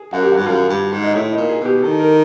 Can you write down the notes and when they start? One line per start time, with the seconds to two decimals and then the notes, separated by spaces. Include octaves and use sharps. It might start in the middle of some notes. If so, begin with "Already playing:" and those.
Already playing: G#4
0.12 F#2 F#4
0.22 G4
0.32 F#4
0.36 G2
0.46 F#2 F4
0.69 G2
0.92 G#2
1.04 D#4
1.14 A2 E4
1.32 D#4
1.37 A#2
1.49 G#4
1.61 B2 G4
1.82 D#3 A4
1.99 A#4